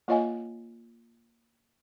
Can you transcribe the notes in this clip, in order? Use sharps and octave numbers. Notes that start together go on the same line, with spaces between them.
A#3 F4 C#5 D#5 F5 G#5